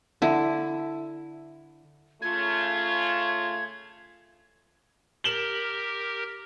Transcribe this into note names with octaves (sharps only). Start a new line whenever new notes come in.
D3 E4
C#3 A3 F4 G#6
G4 A#4 E7 F#7 G7